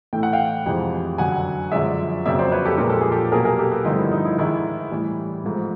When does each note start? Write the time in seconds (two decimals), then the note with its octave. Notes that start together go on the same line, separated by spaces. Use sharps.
0.13 A2 E3 A3 G5
0.23 F#5
0.33 F5 G5
0.66 F2 C3 E3 G#3
1.18 F#2 D3 F#3 F#5 G#5
1.72 F#2 D3 F3 G#3 D5 E5
2.26 F2 C#3 F#3 A#3 D5 E5
2.39 C5 D5
2.52 B4 C#5
2.65 G4 A4
2.78 A#2 F3 G#3 A#4
2.89 A4
3.01 G#4
3.12 G4 A4
3.32 B2 F#3 A#3 G#4 A#4
3.45 G#4 A#4
3.59 G4 A4
3.71 A4 B4
3.85 G2 D3 F3 A3 D#4 F4
3.98 E4
4.12 D#4
4.25 E4
4.38 G#2 D#3 G#3 E4
4.91 A2 E3 G3
5.44 G#2 F3 A3